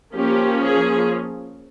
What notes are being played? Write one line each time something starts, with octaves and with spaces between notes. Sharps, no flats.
F3 A#3 C#4 G4
G#4